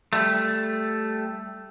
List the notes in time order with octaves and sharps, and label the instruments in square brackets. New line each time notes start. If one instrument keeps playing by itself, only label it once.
[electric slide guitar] G3 A3